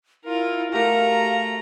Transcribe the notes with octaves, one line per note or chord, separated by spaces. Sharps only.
E4 F4 A#4
A3 F#4 G4 A#4 F5 A#5